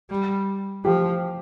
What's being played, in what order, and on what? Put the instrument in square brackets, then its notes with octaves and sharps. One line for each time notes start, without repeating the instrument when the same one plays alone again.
[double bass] G3
[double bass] F3 [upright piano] G4